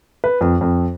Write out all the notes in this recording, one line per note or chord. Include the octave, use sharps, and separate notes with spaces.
B4
F2
F2